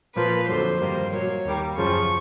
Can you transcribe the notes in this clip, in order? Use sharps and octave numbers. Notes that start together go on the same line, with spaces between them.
A#2 F3 A#3 B4
F2 D3 F#3 C5
G2 D#3 G3 A#3
A#2 F#3 A#3 C#5
D#2 D#3 G3 A#3
F#2 C#3 F3 C#6